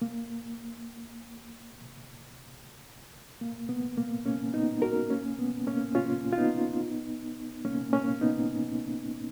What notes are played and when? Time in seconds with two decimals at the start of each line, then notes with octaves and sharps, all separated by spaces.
0.02 A#3
3.41 A#3
3.69 B3
3.97 A#3
4.26 A#3 C#4
4.54 B3 D#4
4.82 F#4 A#4
5.10 A#3 C#4
5.39 B3
5.67 A#3 C#4
5.95 C#4 F4
6.33 F4
6.38 B3 D#4
7.65 A#3 C#4
7.93 A#3 C#4
8.21 B3 D#4